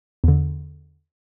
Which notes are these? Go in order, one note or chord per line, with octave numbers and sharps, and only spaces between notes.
E2 D3